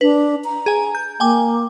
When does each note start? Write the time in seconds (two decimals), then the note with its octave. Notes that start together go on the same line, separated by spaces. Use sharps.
0.01 D4 B4
0.44 A#5
0.66 G#4 G#5
0.95 G6
1.20 A#3 G5 G#5 D6